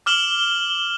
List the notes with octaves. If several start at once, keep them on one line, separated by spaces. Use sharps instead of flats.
D6 F6 E7 F#7 G7